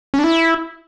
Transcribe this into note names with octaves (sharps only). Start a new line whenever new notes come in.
C#4
D4
E4